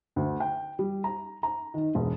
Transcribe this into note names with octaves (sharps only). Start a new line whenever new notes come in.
D2
G5
G3
A#5
A#5
D#3
E1